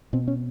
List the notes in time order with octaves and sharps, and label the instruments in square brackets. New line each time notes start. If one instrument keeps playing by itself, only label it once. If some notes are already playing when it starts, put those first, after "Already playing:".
[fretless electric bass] B2 C4
C#4